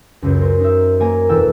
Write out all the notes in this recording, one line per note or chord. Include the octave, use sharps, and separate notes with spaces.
C#2 F#2
A#4 C5
D#4 E5
A#3 G#5 A#5
E1 E3 E4 A4 G5 E6